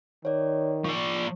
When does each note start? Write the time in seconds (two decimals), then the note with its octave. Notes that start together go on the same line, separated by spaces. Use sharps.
0.25 D#3 C#5 D5
0.85 F3 D5 C#6